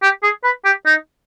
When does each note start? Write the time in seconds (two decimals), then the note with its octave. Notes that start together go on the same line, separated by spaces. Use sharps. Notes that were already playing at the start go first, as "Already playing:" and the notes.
0.03 G4
0.23 G#4
0.44 B4
0.65 G4
0.86 D#4